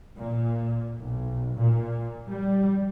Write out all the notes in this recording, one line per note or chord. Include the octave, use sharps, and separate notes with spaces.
A#2
B1
A#2
G3